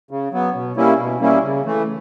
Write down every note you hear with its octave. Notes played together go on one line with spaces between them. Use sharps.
C#3
F#3 B3
B2
G3 A#3 C#4 E4
B2
G3 A#3 C#4 E4
C#3
E3 A3